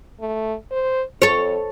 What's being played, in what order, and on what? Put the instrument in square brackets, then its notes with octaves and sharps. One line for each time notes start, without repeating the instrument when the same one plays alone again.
[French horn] A3
C5
[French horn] F2 [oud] A4 C#5